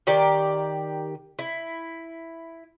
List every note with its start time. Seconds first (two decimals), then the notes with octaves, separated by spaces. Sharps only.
0.07 D#3 G4 D5
1.39 E4